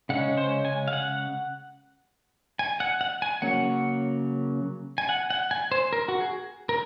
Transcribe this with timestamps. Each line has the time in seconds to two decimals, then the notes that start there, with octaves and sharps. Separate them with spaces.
0.09 C#3 G#3 C#4 F#5
0.37 C5
0.65 G#5
0.88 F5
0.93 F#5
2.59 G#5
2.80 F#5
3.01 F#5
3.22 G#5
3.42 C#3 F#3 A#3 C#4 F#5
4.98 G#5
5.09 F#5
5.30 F#5
5.51 G#5
5.72 C5
5.93 A#4
6.08 F#4
6.20 G#4
6.69 A#4